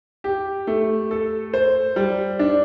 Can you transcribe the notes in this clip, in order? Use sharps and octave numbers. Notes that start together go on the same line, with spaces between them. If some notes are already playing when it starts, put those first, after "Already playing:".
G4
A3
A4
C5
G3
D4